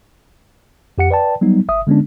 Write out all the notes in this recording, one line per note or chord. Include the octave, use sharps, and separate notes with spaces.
F2 G4 F#5 C#7
B4 D5 G5 A5
F#3 G3 B3 D#4
G1 E5 D#6
D3 G#3 B3 C#4 D4